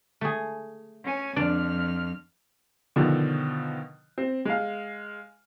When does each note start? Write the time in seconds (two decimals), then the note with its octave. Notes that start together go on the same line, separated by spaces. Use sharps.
0.21 A3 G#4
1.05 C#4 G#5
1.36 F2 D4 D5 F6
2.96 B2 D3 D#3 F3
4.18 C4
4.45 G#3 F5